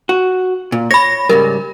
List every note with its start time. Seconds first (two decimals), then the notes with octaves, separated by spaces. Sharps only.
0.09 F#4
0.72 A#2
0.91 C#5 B5 A#6
1.29 G#2 C#3 G3 A#4